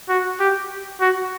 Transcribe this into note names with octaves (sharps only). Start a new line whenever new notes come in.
F#4
G4
F#4